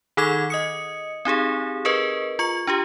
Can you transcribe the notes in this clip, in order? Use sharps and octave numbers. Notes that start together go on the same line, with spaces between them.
D#3 D#4 G#4 A4 D6 G#6
D#5 D#6 C#7
C4 D#4 G4 G#4
G#4 A#4 B4 D#5
F4 C#6 C#7
D4 F4 G4